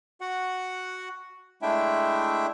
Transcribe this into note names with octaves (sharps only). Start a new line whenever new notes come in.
F#4 F#5
G#3 A3 D4 E4 E5 G5